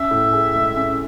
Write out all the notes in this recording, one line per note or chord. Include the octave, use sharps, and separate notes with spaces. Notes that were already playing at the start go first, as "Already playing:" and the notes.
Already playing: C#4 E5
A2
G#4
G#3
C#4